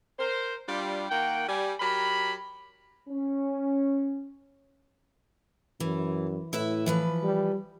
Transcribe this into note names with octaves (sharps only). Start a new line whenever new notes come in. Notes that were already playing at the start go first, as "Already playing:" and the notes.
A#4 C5
G3 D4 F4
D#3 A#3 F#5 G5
G3 G#5
F#3 G4 A#4 B5
C#4
F#2 E3
A2 E4 B4 E5
E3 F3 B4
G3